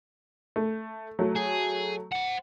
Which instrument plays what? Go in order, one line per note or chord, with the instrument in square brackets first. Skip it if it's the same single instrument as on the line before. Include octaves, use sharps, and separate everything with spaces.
[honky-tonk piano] A3
F#3 A3
[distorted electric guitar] G#4
C5 F#5